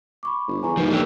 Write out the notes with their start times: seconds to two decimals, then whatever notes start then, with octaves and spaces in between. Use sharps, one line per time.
0.23 B5 C#6 D6
0.47 G1
0.63 E2 G#5 A#5 C#6
0.77 D#2 F3 G3 B4
0.90 A#3 D4 G4 A4 E6